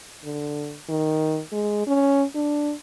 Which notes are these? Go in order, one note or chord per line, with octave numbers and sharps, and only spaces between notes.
D3
D#3
G#3
C#4
D4